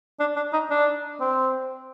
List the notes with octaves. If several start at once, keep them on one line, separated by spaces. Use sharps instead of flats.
D4
D4
D#4
D4
C4